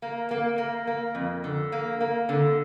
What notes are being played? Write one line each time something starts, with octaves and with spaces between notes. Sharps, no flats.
A#3
A#3
A#3
A#3
F2
D3
A#3
A#3
D3